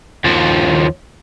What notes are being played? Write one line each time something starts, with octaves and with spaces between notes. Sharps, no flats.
D#2 F3